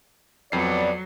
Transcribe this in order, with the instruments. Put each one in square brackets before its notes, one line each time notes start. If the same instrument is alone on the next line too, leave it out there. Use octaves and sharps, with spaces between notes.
[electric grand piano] F2 C7 [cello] F#3 [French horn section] B3 C#5 D5